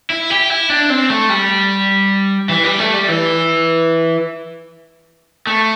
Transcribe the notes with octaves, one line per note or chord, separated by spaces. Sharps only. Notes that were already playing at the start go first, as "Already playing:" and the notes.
E4
G4
E4
D4
C4
A3
G3
E3
G3
A3
G3
E3
A3